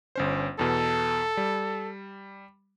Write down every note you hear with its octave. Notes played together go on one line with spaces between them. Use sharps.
G1 C#4 C5
E2 B2 A4
G3